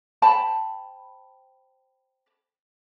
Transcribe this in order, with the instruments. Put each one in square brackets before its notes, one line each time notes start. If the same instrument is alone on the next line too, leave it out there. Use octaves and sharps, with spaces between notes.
[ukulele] C5 G5 A5 B5